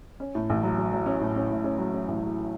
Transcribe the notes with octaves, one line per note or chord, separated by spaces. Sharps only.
C#4
A2
A1
F#3
F#3
F#3
C#4
A2
C#4
A2
C#4
F#3
C#4
A1
F#3